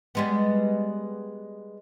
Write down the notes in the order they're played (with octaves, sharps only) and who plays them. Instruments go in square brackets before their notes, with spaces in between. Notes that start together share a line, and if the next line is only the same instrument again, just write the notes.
[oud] G3 G#3 B3